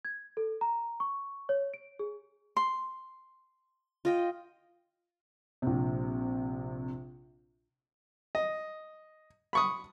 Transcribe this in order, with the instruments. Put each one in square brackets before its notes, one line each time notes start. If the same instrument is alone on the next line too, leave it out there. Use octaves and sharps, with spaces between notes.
[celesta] G#6
A4
A#5
C#6
C#5
D7
G#4
[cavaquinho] C6
[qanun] F4 D#5 G5
[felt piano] A#1 C3
[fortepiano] D#5
B5 C#6 D#6